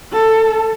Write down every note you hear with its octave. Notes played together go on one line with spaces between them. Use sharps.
A4